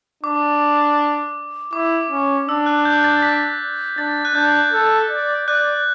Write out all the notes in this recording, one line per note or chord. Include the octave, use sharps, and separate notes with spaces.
D4 D6
E4 D6
C#4
D4 E6
F#6
G6
A6
B6
D4 A6
F#6
D4 G6
A4
D5
D5 F#6